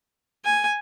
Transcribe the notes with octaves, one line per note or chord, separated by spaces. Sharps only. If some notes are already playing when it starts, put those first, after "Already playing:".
G#5